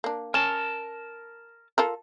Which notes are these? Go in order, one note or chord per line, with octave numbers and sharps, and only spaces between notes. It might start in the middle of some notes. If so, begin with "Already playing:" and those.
A#3 D4
C#4 A#4 A5
F4 A4 A#4